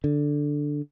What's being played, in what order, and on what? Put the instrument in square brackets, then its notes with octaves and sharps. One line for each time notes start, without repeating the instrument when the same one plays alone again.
[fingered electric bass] D3